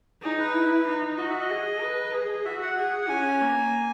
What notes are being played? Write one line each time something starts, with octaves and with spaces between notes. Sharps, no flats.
D#4 G#4
B4
E4
D#4
F#4 D#5
E5
D#5
G#4
B4
G#4
F#4 E5
F#5
G#4
F#5
C#4 G#5
A#3